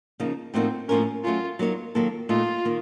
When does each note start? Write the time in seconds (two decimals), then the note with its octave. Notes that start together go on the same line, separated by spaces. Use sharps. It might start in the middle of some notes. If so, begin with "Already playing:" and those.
0.20 C#3 F3 A#3 D#4
0.54 A2 F3 A#3 C4 D#4 F#4
0.89 A2 F3 A#3 C#4 F4 A#4
1.24 F#3 A3 C#4 F4
1.59 F#3 A#3 D#4 A#4 C#5
1.95 D#3 F#3 A#3 F4 A4
2.29 A#2 A3 D#4 F4 A4 D#5
2.65 D#3 A#3 F4